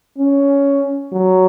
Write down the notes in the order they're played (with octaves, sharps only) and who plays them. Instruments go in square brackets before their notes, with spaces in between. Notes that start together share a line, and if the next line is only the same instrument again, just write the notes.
[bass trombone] C#4
F#3